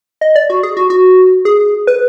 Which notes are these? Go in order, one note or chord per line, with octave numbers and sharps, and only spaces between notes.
D#5
D5
F#4
G#4
F#4
F#4
G#4
B4